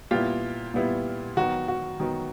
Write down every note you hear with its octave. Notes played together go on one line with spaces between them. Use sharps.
A#2 G3 B3 E4 F4 G4
A#2 G3 B3 E4
D#3 F#3 B3 F#4
F#4
D#3 F#3 B3